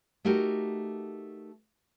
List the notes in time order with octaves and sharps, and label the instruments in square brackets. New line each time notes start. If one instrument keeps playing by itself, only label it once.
[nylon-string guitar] A3 D#4 F#4 G4 A#4